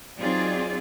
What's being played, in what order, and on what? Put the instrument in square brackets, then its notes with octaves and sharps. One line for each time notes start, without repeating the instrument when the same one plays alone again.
[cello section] F#3 C4 D#4 F4 G#4 D5